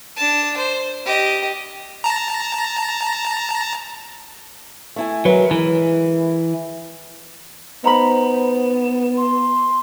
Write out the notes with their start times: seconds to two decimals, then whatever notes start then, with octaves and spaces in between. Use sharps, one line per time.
0.16 D4 A5
0.57 C5
1.06 G4 D#5
2.04 A5 A#5
4.96 A3 E4 G#5
5.25 F#3 G#3 A#4 B4
5.51 E3
7.84 B3 D#4 C5 A#5 B5
9.17 C6